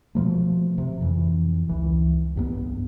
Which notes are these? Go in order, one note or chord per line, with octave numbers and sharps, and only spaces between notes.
B2 F3 A3
C3
F2 E3
C#2 E3
C2 G2 E3 B3